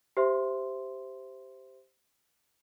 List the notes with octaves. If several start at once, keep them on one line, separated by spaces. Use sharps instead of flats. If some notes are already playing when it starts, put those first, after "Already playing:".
G4 C5 E5 C6